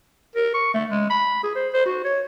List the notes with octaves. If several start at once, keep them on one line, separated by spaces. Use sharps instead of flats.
A#4
C#6
A3
G#3
B5
G#4
C5
C5
F#4
C#5